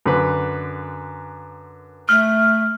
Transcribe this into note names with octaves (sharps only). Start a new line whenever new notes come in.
F#2 D3 B4
A3 F6